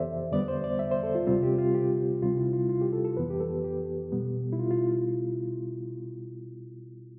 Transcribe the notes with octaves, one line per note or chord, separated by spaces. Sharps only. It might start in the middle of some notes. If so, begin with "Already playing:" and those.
Already playing: F2 E3 B3 G4 A4 C5 D5 E5
E2 D3 G3 B3 D5
C5
D5
E5
C5
A4
F4
D2 C3 G3 C4 F4
G4
F4
G4
D2 C3 G3 C4 F4
E4
F4
F4
G4
A4
A4
F2 E3 B3 B4
G4
A4
G4
B2 G3 B3
E4
F4
F4